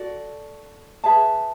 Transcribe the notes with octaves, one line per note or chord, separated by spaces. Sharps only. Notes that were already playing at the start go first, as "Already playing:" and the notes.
Already playing: F#4 A4 D5
G#4 B4 E5 A5